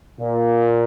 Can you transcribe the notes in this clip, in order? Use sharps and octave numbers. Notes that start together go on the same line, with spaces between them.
A#2